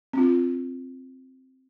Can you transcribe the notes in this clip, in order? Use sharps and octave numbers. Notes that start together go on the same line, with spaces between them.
C4 D4 F4